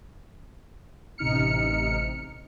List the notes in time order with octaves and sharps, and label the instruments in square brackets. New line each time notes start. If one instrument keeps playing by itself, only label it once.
[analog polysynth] A1 C3 D#4 F6 C#7